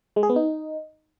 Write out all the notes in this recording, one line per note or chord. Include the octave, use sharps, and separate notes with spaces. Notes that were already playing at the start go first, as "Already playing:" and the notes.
G#3
G#4
B3
D#4